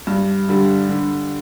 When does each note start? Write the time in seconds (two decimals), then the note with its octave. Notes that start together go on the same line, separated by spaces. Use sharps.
0.07 G2
0.49 D3 G3
0.89 D3